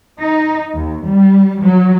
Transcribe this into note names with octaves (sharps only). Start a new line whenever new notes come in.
D#4
D#2
G3
F#3